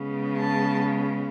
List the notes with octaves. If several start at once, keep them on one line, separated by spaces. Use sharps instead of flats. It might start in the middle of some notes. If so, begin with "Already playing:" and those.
Already playing: C#3 G#3 B3
A5